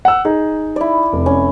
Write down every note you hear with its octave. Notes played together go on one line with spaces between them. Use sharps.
F#5 E6
D#4 G#4
E4 D5
F1
C#4